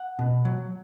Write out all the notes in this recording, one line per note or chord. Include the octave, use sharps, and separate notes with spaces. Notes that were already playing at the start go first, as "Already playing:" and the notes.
Already playing: F#5
B2
F#3